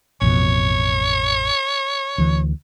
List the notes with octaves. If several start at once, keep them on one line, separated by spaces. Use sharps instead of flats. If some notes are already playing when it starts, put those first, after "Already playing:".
A1 F2 B2 C#5
D2 E3